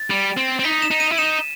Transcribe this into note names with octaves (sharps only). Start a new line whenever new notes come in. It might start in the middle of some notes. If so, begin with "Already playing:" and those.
Already playing: A6
G3
C4
C4
D#4 B6
E7
D#4
D#7
E4
D#4 E7